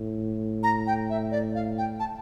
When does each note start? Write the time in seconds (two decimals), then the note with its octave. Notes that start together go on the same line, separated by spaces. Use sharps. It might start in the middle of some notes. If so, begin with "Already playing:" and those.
Already playing: A2
0.63 A#5
0.87 G5
1.10 E5
1.31 D5
1.55 F5
1.78 G5
2.00 A5